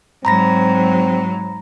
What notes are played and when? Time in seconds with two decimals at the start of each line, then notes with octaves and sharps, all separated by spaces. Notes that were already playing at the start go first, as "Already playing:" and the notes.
0.25 G#2 F#3 C4 A#5 B5 A#6